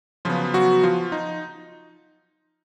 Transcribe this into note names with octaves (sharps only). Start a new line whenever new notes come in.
C#3 F3 F#3 B3 F4
F#3 F#4
F3 F4
D#4